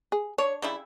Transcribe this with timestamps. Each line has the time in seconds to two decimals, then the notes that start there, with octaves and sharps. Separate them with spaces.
0.12 G#4
0.38 D4 C#5
0.62 C#3 G3 E4